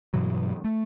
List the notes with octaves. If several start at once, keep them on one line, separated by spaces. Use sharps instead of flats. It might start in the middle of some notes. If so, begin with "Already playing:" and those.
G2 B2 E3 F#3
A3